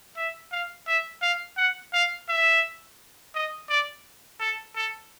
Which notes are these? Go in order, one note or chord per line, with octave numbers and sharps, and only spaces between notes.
E5
F5
E5
F5
F#5
F5
E5
D#5
D5
A4
A4